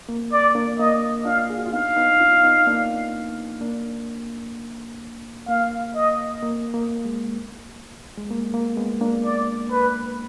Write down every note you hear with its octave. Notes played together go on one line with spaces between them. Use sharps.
A#3
D5
A#3 D4
A#3 D#5
D4 F4 F5
G#4
F#4
F4
B3 D#4 F5
B3 D#4
D4 F4
B3 D#4
A#3 D4
A#3 D4
A#3 F5
D#5
A#3
A#3
G#3
G#3
A#3
A#3
G#3 B3
A#3 D4
D5
B4